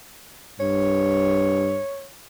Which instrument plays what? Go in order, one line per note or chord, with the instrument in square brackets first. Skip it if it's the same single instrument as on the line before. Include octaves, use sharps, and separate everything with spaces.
[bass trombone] G2 [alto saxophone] C#5